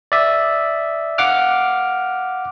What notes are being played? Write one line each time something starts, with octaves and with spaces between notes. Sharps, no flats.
D5 E5
F5 F#5 D6 F6